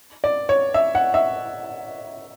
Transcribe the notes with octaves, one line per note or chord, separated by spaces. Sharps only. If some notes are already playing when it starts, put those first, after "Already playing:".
D5
C#5
E5
F#5
E5